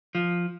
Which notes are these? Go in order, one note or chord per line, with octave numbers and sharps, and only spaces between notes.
F3